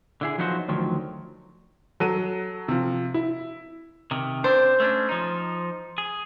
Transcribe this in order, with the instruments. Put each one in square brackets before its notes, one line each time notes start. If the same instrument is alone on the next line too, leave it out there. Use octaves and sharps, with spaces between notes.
[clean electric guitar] D3 E4 G#4
F3 F#3 B3 D#4 F#4 C5
D2 D#3 F3 F#3
[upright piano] F#3 A4 D#7
C3 F3
E4
[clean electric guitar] C3 D#3
[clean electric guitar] C4 D4 [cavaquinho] C5
[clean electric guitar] A3 C#4 D4
F3 D#4
G#4